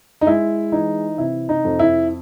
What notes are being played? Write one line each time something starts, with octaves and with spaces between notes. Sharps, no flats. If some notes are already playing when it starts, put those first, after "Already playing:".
D#4
G#3 E4
E3 D#4
C3 E4
D#4
F2
E4